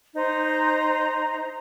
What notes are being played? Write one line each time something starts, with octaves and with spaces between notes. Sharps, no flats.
D#4 C5 A#5